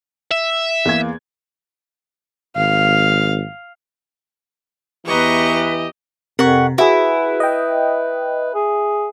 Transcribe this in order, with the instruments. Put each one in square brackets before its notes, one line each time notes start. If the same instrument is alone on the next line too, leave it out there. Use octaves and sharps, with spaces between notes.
[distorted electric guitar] E5
[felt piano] E2 A#3 G#6
[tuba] G#1 [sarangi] F5
[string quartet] E2 A#5 C#6 [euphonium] E3 [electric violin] G4 D#5 [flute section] B4
[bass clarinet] F2 [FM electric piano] C3 A#4 [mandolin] F#5 C#6
[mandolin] E4 [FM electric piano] F#4 G#4 [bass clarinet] B4
[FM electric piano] D#5 G5
[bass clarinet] G#4